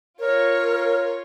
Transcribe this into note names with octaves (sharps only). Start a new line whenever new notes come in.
F4 A#4 C#5